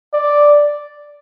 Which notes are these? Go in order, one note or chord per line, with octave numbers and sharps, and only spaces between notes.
D5